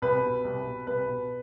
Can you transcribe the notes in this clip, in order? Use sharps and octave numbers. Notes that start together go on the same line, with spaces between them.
C2 B4
B2
C2
B2
C2 B4
B2